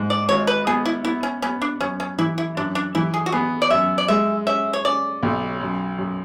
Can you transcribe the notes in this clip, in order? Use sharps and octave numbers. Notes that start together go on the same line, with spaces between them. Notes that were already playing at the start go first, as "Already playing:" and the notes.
Already playing: G#2
D5
G#1 C#5
B4
B3 G#4
E4
B3 E4
C#4
B3 C#4
D4
F#2 C#4
C#4
E3 E4
E4
F#2 D4
D4
E3 E4
G#4
F#4
B3 G#4
D5
F#2 E5
D5
G#3 E5
C#4 E5
C#5
C#4 D5
B1
F#2
F#2